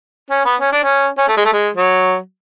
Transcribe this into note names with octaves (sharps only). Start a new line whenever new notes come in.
C#4
B3
C#4
D4
C#4
C#4
A3
G#3
A3
G#3
F#3